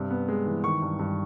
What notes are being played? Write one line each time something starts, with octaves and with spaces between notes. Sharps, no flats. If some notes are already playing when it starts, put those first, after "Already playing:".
Already playing: G2 C3
B3
G#3
E3
D#3 C#6
G2
G2